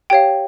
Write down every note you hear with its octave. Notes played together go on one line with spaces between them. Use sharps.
G4 C#5 F5 G5